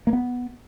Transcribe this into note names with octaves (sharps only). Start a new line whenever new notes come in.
A#3
B3